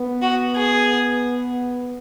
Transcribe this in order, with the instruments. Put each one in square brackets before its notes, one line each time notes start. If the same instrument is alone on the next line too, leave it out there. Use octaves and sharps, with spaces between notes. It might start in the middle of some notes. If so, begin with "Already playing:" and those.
Already playing: [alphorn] B3
[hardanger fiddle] F#4
G#4